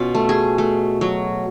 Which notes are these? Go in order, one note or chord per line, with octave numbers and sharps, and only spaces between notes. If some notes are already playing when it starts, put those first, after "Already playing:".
Already playing: B2 C#4 F4
A3
G#4
A3
F#3